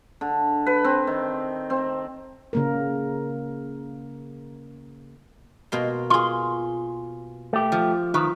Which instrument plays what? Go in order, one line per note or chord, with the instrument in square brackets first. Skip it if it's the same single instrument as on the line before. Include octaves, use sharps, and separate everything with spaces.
[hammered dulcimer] D3
B4
C4
D#3
C4
[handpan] C#3 A#3 A#4
[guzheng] B2 A#3 C6
[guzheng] F4 G#4 [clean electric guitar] C6
[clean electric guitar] A3 G4
[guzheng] F3
[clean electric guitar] D#3 F3 [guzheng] B4